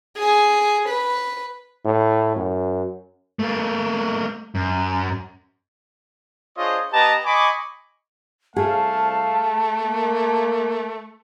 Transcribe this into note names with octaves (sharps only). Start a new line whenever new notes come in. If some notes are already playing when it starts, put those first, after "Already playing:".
G#4
B4
A2
F#2
A3 A#3
F#2
D4 F4 G#4 C5 C#5 D#5
B3 G4 B4 D#5 A5 A#5
D#5 G#5 B5 C#6 D6
C2 A3 G#4 F5 A5
A#3